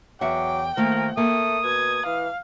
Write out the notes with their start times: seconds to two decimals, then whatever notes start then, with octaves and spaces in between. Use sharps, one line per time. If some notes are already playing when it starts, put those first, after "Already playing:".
0.21 E2 F#3 E5 F#5 G5 D6
0.77 D#3 F3 A3 A#3 A#4
1.17 A3 A#3 D#6
1.64 B2 G#6
2.06 E3 F5